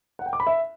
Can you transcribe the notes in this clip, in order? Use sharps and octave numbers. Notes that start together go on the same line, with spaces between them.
F#5
G5
D6
B5
E5